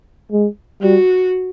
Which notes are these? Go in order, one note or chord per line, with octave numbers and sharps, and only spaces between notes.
G#3
G3 F#4